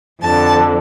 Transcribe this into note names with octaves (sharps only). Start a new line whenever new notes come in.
F2 D3 A5